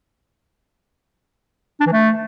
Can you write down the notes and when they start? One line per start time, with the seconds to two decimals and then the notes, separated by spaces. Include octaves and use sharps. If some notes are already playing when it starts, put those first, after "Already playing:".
1.80 D4
1.86 E3
1.92 A3